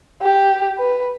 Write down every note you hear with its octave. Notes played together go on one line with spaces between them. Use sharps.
G4
B4